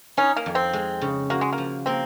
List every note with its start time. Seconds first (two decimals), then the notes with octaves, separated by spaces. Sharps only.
0.17 C#4 D#4
0.37 A#3
0.46 F2
0.55 C4
0.73 G#3
1.01 C#3
1.30 A#3 F#4
1.41 G#3
1.53 A#3
1.58 F3
1.86 A#3 C4